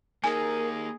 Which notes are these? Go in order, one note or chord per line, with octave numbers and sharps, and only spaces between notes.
A#3 D#4 G#4 A#4 G#5